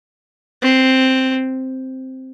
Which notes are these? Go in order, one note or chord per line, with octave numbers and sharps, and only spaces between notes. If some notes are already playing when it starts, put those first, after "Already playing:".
C4